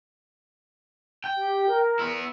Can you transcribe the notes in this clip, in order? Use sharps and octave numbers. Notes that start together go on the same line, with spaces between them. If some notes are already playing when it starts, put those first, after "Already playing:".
G5
G4
A#4
B3 E4